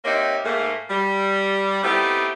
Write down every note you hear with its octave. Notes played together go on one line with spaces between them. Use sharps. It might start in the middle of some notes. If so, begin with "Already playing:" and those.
A#3 C4 D#4 G4 C#5 E5
G#2 A3 A#3
G3
A3 B3 C4 D#4 E4 G4